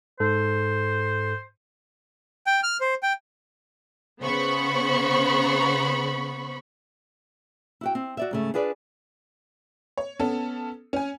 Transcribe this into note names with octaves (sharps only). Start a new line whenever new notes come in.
G#2 A4 C5
G5
F6
C5
G5
C#3 B3 C5 B5 C#6
E4 F#4 G5
C4
F#4 D5 E5
G#2 C#3 A3
D4 F4 G#4 B4 D5
C#5
B3 C#4 A4
C#4 G#5